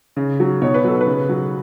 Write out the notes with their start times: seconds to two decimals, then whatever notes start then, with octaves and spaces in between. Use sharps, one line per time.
0.17 C#3
0.40 F#3
0.62 B2 C#5
0.74 B4
0.84 F#3 A4
1.01 B4
1.07 C#3
1.29 F#3